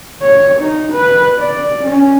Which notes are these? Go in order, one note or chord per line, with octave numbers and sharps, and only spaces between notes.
C#5
D#4
B4
D5
C#4